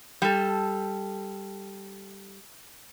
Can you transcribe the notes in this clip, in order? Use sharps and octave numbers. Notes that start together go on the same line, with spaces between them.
G3 A4